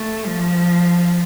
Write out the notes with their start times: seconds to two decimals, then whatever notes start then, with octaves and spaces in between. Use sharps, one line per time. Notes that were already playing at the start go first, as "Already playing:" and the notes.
Already playing: A3
0.26 F3